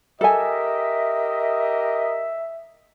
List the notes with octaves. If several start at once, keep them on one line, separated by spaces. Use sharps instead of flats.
G4 A4 A#4 D#5 E5 G#5